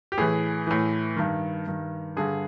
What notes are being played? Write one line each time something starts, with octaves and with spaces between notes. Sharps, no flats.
G4
A2 E3 G#4
A2 E3
G2 D#3
G2 D#3
G2 D3 G#4